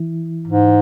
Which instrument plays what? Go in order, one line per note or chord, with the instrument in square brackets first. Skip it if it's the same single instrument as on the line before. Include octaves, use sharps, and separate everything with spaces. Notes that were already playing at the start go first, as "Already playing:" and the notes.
Already playing: [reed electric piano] E3 E4
[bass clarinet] G#2